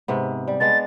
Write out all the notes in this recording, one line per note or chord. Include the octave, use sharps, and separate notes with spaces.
G#2 C3 B3
G3
G#3 B3 D4 A6